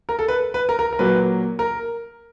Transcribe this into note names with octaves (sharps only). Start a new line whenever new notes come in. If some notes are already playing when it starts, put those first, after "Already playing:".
A#4
A4
B4
B4
A#4
A#4
A#4
A#2 F#3 A#3 B4
A#4